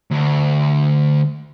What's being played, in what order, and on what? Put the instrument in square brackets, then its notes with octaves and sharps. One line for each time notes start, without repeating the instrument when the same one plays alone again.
[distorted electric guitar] D2